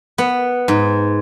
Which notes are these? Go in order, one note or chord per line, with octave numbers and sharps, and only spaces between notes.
B3
G#2